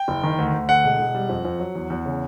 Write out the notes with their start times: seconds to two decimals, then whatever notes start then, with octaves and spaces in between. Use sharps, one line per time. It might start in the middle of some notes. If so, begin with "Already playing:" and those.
Already playing: G5
0.08 F#1
0.23 D#3
0.38 D2
0.54 D2
0.69 D3 F#5
0.84 E1
0.99 E1
1.15 G3
1.29 F2
1.45 F2
1.60 F#3
1.75 E2
1.90 E2
2.06 C#3